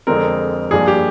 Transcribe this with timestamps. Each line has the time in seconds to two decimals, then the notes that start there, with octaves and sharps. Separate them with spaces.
0.07 F2 D3 G#3 C4 A#4
0.71 G2 F3 A#3 D4 G#4
0.88 G4